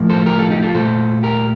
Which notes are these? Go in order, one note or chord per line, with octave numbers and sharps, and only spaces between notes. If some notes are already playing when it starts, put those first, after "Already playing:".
Already playing: A2 F3 A#3
A4 C5
G4 A#4
F4 A4
D#4 G4
F4 A4
A#2 A3 A4 C5
G4 A#4